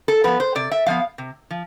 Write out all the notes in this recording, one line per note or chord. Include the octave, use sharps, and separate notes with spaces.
A4
F3 B3 B4
C5
C3 D5
E5
F3 B3 F5
C3
F3